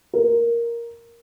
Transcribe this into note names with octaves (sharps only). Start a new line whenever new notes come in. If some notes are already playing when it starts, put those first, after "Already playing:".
A#4